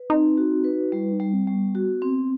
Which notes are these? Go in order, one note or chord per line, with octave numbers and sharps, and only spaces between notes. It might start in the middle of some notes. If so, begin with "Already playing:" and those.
Already playing: B4
C4 D#4
F#4
B4
G3 E4
D#4
G3
C4
G3
B3
F#4
C4